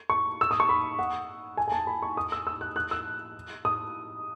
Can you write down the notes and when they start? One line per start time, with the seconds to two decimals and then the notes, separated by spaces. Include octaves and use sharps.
0.10 C#6
0.41 E6
0.51 D#6
0.60 C#6
0.69 B5
0.99 F#5
1.57 G#5
1.68 G#5
1.72 A5
1.87 B5
2.02 C#6
2.17 D#6
2.32 E6
2.47 E6
2.61 F#6
2.76 F#6
2.91 E6
3.65 D#6